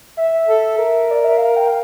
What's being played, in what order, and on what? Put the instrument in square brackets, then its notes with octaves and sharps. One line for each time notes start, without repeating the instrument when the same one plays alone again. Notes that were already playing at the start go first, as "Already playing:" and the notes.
[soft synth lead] E5
[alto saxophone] A4
A#4
[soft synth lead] D5
E5
F5
G5
F5